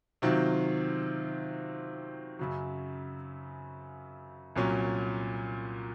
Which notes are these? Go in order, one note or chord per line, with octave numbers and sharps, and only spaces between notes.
C3 D#3 F#3 C4 F4
F#2 C#3 F#3
C2 A#2 F#3 C#4